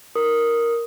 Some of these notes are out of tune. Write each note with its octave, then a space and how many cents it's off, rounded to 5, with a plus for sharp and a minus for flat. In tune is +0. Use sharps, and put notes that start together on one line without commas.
A#4 +0 D#6 +0